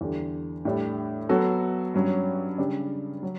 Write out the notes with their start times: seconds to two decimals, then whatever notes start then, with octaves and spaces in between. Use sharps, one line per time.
0.01 E2 D3 G3
0.65 A2 G3 D4
1.29 F#3 B3 F#4 A4
1.94 G2 F#3 C#4
2.58 C#3 G3 D4
3.23 F#3